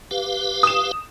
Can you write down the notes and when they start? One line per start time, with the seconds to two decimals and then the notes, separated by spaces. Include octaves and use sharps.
0.11 G4 B4 F5
0.63 D#6 E7